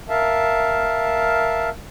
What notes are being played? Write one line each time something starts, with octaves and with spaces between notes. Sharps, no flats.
A#4 E5 F5 A5